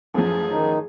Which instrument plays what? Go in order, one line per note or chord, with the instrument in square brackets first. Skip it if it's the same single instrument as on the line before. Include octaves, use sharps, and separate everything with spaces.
[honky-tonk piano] A1 F#2 F3 [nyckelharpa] G#4
[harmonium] D#3 D#4